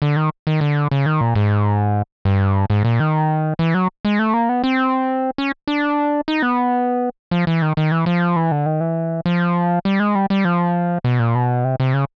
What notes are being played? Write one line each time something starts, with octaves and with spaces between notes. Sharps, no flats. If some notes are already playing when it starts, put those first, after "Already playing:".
D3
D#3
D#3
D3
C#3
D#3
A#2
G#2
G2
G#2
A#2
D#3
E3
F#3
G#3
A3
A#3
B3
C4
C#4
D4
D#4
B3
F3
E3
D#3
D#3
E3
F3
E3
D3
D#3
E3
F3
G3
G#3
G3
G3
F3
B2
A#2
B2
C3
C3
C#3